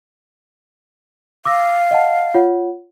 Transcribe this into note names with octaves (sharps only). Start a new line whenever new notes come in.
F5 D6 E6 A#6
D#5 F#5 A5
F4 C#5 F#5